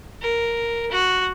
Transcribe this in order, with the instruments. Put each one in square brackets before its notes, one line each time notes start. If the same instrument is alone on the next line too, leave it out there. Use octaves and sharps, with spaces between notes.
[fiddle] A#4
F#4